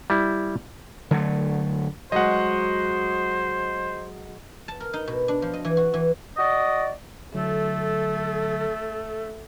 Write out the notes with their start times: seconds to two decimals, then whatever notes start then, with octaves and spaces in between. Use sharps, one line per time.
0.10 G3 E4
1.11 D3 F#3 A3
2.12 F#3 G#3 C5 D#5 F#5
4.68 A5
4.80 A#4
4.93 D#4
5.08 B2
5.28 D4
5.42 F3
5.53 D#5
5.65 E3
5.77 F#4
5.94 E3
6.37 F#4 D5 D#5
7.34 D3 F#3 A3 A4